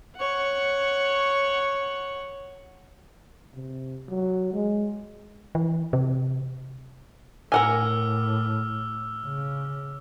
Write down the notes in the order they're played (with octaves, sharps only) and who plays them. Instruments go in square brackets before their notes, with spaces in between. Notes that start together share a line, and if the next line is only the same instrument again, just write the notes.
[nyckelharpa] C#5 F#5
[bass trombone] C3
F#3
G#3
[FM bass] E3
C3
[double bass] A2 [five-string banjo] A#4 F#5 G#5 [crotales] D6 E6 F6
[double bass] C#3